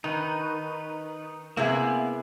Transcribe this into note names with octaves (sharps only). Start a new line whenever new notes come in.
D#3 D#4 B4
C3 A#3 B3 E4 G#4